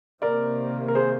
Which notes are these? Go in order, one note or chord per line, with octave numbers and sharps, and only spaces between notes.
C3 D#3 A#3 A#4 D5
A#4
G#4 C5